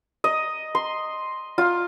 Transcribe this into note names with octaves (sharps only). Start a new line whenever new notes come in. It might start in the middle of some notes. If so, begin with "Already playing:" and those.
D#5
C6
F4